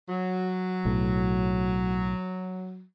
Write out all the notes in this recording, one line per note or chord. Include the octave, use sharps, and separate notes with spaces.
F#3
B1 A2